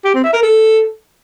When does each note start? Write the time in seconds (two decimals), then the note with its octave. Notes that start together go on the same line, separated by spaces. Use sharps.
0.05 G4
0.14 C4
0.24 E5
0.33 A#4
0.42 A4